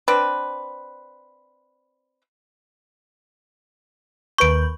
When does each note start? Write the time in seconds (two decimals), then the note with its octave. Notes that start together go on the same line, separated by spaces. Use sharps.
0.08 C4 D4 B4
4.38 D#2 B4 C#6 G6 D7